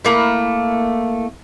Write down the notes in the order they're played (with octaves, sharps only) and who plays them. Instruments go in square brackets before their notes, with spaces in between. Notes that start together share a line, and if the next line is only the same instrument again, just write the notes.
[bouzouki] A3 A#3 E4